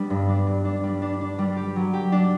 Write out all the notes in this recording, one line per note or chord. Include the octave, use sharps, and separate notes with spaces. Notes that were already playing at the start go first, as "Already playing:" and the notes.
Already playing: G3 B3 D4
G2
D4
G2
D4
G3
D4
D4
G3
G4
F#3
G4
D4